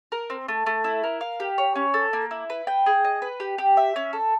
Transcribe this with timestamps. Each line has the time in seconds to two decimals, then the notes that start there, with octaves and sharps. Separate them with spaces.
0.12 A#4
0.30 C4
0.48 A3
0.66 A3
0.84 E4
1.04 A#4
1.21 F5
1.40 G4
1.58 C#5
1.76 C#4
1.94 A4
2.13 A#3
2.31 E4
2.50 B4
2.67 G5
2.86 G#4
3.05 D#5
3.22 B4
3.40 G4
3.58 G4
3.77 E5
3.96 C#4
4.13 A4